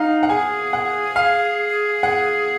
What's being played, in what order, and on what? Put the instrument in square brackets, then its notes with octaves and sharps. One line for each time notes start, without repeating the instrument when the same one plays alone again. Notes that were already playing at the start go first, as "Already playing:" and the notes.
Already playing: [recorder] D#4 [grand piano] F5 F#5
[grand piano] F#5
[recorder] G#4 [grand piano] G#5
[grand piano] F#5
F5
F#5